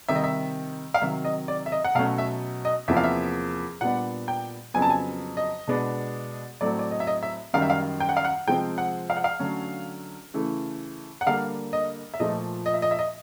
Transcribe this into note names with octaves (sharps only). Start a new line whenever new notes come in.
C3 D#3 G3 E5
D#5
E5
F5
C3 D#3 F#3 E5
D#5
D5
E5
D#5
F#5
B2 F#3 A3 C#4 F5
E5
D#5
E2 C3 F3 A#3 E5
F5
E5
A#2 G3 B3 D4 F#5
G5
F2 C#3 F#3 B3 G#5
A5
G#5
D#5
B2 G#3 B3 D4
A2 F#3 A3 C4 D5
D5
D#5
E5
D#5
E5
F#2 D#3 G3 F5
E5
F5
G5
F#5
F5
F#5
C3 F3 G#3 C4 G5
F#5
F5
F#5
F5
D3 F#3 A3 C#4
C#3 E3 A3
F#5
D3 G3 A#3 F5
D#5
E5
A#2 F3 A3 D#5
D#5
E5
D#5
E5
D#5